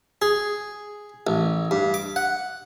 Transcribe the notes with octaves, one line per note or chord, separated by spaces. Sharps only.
G#4
A1
G2
D6
F#5